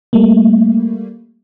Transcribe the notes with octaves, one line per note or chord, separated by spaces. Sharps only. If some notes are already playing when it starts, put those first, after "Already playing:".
G3 A3 A#3